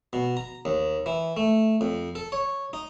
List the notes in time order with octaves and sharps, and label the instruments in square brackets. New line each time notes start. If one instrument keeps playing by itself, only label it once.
[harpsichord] B2
A#5
D#2
E3
A3
F2
A4
C#5
D#4